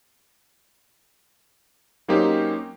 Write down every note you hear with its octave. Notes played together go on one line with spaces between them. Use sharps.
F#3 A#3 C4 C#4 D#4 G4